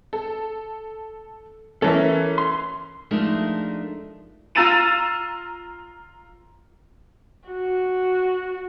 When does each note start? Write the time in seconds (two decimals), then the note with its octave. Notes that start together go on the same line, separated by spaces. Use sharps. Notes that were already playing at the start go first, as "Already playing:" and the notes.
0.13 A4
1.82 E3 C#4 A4 A#4 E5
2.38 C6
3.11 F3 G#3 A3 D4 D#4 A#4
4.55 F4 A#5 E6 A6 D#7 E7
7.49 F#4